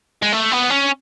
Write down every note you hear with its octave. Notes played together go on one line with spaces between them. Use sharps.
G#3
A3
B3
C#4